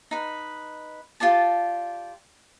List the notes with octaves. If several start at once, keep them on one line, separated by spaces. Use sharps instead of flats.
D#4 B4
F4 G4 D5 A5